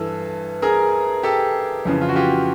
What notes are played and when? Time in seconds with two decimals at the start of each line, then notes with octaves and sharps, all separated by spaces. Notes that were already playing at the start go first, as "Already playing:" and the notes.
Already playing: G2 E3 A4
0.62 G#4 A#4
1.23 G4 A4
1.85 F2 C#3 E3
2.01 F4
2.09 F#4
2.15 F4 G4